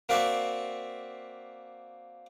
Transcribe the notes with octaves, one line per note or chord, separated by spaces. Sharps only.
A#3 C4 F#4 D5 E5